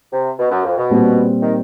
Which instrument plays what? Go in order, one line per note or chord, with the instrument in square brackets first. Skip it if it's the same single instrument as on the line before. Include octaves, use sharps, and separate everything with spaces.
[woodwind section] C3
B2
F#2
F2
B2
[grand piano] A#2 G3 C4
[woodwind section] D#3